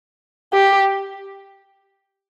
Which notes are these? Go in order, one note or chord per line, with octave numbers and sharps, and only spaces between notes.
G4